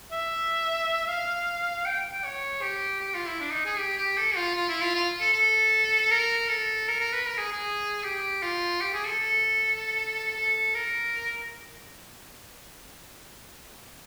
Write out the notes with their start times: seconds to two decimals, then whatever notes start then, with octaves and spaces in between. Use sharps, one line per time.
0.12 E5
1.08 F5
1.86 G5
2.11 G5
2.24 C#5
2.62 G4
3.00 G4
3.15 F4
3.27 E4
3.40 D4
3.52 D#4
3.65 G#4
3.78 G4
3.98 G4
4.17 A4
4.36 F4
4.55 F4
4.69 E4
4.81 F4
4.95 F4
5.20 A4
5.33 A4
6.11 A#4
6.49 A4
6.88 A#4
7.00 A#4
7.13 B4
7.27 A#4
7.38 G#4
7.52 G#4
8.04 G4
8.43 F4
8.81 G4
8.94 G#4
9.07 A4
9.19 A4
10.36 A4
10.74 A#4